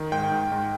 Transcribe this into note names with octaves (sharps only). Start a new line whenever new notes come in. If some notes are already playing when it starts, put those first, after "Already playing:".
Already playing: D#3
G#2 G5
G#2
G#2